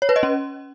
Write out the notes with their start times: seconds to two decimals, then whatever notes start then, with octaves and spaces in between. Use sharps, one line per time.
0.02 C#5
0.09 B4
0.16 D#5
0.23 C#4